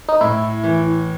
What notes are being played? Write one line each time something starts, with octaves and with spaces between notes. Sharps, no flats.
D#4
A2 E4
E3